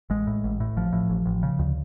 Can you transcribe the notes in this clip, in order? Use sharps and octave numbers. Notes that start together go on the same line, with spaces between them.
A1 G#3
A2
A1
A2
A1 F3
A2
A1
A1
C#3
D2